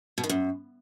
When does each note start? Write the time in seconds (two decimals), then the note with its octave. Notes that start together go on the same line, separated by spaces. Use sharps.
0.18 B2
0.24 D#3
0.29 F#2